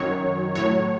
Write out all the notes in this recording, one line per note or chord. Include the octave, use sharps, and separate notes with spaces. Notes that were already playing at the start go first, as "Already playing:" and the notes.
Already playing: F#2 D#3 F#3 C#5
A2 F#3 C#5